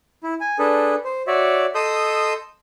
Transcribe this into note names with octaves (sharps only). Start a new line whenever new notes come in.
E4
G#5
D4 G#4 A4 B4
C5
F#4 C#5 D5 E5
A4 D#5 C6 D#6 E6 G6